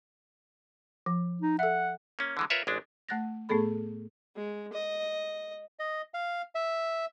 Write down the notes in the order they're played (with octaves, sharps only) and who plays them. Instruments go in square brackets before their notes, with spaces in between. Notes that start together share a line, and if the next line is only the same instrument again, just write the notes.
[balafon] F3
[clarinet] D#4
[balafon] A4 E5 [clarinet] F#5
[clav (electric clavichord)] A#3 C#4
D3 E3 G#3
F4 A#4 B4 C#5 E5
A1 G#3 D4
[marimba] A3 F#5 F#6 A6 A#6
A2 A3 B3 G#4 A4 B5
[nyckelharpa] G#3
D#5
[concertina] D#5
F5
E5